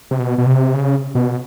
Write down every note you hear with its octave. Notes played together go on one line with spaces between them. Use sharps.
C3
B2
B2
C3
C#3
B2